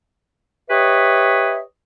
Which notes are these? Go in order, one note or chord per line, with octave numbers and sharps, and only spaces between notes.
G4 B4 C#5 D#5 E5